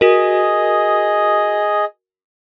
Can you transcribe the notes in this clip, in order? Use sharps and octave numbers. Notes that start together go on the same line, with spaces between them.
F#4 G#4 A#4 D#5